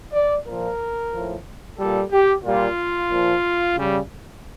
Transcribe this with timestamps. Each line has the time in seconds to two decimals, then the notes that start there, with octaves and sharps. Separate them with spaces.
0.13 D5
0.46 A#2 F3 A#4
1.12 A2 F3
1.79 A#2 G3 A4
2.12 G4
2.44 A#2 G3 F4
3.10 A#2 F3
3.76 C#3 G3